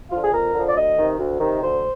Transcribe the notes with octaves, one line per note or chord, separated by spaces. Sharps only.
D3 F3 F4
G#4
F2 A#4
D3 F3
D5
D2 D#5
C3 D#3
D2
C3 D#3
D2 C5